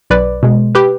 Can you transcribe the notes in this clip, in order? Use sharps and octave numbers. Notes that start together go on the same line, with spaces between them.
B1 B4 D5
B2 G#3
G4 B4